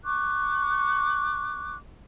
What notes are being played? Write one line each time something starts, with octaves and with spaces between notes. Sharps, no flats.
C#6 D6 F#6